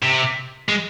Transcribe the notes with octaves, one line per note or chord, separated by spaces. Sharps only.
C3
G#3